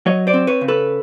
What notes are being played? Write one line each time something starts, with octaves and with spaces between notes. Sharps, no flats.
F#3 C#5 D#5
C5 D5
C4
B4 C#5
C#3
A4 B4